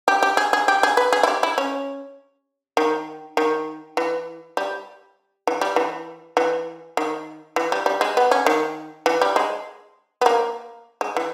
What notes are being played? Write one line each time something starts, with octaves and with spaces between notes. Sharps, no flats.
G4
G4
G#4
G#4
G4
G#4
B4
G#4
E4
G4
E4
C#4
D#3
D#3
E3
G3
E3
G3
E3
E3
D#3
E3
G3
G3
G#3
B3
C#4
D#3
E3
G3
G#3
B3
A#3
G#3
E3